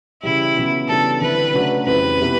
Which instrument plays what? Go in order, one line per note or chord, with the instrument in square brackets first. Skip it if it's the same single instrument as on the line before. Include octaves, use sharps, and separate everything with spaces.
[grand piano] C#3 E3 G3 [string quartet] E4
[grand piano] C#3 F#3 B3
[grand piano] C#3 E3 G3 B3 D4 [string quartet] A4
[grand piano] D3 G3 C4 E4 [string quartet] B4
[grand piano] C#3 F#3 A3 D4 F#4
[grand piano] F2 C#3 E3 G3 C4 [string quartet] B4
[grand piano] C3 E3 G3 B3